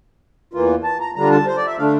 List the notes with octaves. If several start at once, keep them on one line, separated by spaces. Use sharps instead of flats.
E2 E3 A#3 F4
A5
A#5
D3 G3 D4 F4 A#5
A5
C5
D5
E5
D3 A3 D4 F5